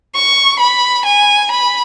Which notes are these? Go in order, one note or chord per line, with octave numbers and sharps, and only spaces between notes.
C#6
B5
G#5
B5